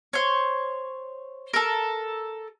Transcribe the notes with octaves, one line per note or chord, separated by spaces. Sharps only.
C5 C#5
A4 A#4